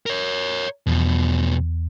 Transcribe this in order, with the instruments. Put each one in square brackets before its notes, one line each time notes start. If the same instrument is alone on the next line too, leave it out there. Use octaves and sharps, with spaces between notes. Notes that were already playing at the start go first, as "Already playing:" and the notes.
[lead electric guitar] A#4 C#5
[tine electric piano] E2 [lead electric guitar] B2 F3